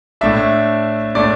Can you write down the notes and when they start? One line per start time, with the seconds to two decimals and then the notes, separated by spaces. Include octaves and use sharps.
0.21 A2 A3 D4 E5
1.15 A2 A3 D4 D5